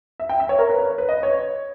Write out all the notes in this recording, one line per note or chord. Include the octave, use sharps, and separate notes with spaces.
E5
G5
E5
C#5
A#4
B4
C#5
B4
D#5
C#5